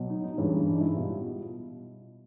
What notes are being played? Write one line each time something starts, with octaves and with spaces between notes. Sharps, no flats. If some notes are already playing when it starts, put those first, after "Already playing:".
Already playing: B2 F#3
D#4
D#4
G2 E3 G#3 C#4
D4
D#4
E4
B2 G3 F4